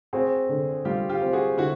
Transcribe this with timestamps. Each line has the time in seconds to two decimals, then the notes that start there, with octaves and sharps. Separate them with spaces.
0.13 C4 F#4 G#4
0.49 D3
0.85 G3 F4 G4
1.09 F4 G4
1.22 C4
1.33 F#4 G#4
1.57 D3 E4 F#4